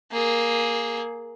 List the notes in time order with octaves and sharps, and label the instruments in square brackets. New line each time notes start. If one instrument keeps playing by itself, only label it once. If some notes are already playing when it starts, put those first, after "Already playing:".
[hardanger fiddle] A#3 G#4